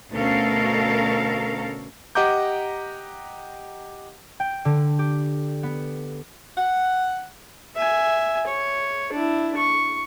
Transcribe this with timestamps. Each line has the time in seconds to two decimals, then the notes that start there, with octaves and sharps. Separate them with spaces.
0.12 D2 B2 C#4 A4 A#4 F5
2.15 G4 D#5 F#5 A#5 D6 G6
4.40 G5
4.65 D3
4.99 G4
5.63 B3
6.58 F#5
7.76 E5 G#5
8.47 C#5
9.13 D4 E4
9.57 C#6